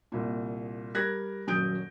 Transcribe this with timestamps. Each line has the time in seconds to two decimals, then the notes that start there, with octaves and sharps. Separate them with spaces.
0.12 C2 A#2
0.94 G3 A#4 F#6 G#6 A#6
1.47 D#1 F#2 F#3 D#6 G6 D7